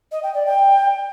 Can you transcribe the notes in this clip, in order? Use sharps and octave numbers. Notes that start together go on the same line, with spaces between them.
D#5
G5
D5
G5